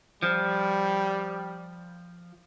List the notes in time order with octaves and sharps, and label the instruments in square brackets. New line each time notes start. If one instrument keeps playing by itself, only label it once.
[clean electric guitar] F3 [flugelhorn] G3